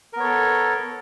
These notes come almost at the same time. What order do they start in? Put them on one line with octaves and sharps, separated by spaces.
A#4 B3 C#5 A4